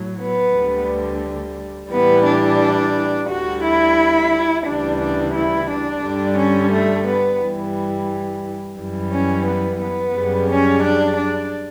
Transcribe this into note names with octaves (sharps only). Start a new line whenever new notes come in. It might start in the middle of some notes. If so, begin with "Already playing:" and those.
Already playing: A2 F#3
B3
D2 D3 G3
A2 E3 G3 B3
D4
D2 D3 G3 F#4
E4
D2 C#3 E3 G3 D4
D4
E4
D4
G2 D3 G3
C#4
A3
B3
G2 E3 G3
F#2 E3 G3
C#4
B3
B3
F#2 C#3 G3
C#4
D4
D4